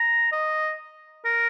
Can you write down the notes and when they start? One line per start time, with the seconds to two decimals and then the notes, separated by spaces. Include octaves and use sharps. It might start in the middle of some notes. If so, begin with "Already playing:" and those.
Already playing: A#5
0.32 D#5
1.25 A#4